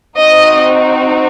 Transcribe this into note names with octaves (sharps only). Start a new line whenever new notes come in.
C4 D#4 F#4 D#5